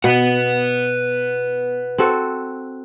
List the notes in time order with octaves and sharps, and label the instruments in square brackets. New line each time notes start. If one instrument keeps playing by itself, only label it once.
[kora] B2 [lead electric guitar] B4 F#5
[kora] C4 F#4 A4